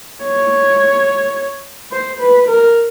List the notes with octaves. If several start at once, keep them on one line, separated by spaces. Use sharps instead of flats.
C#5
C5
B4
A#4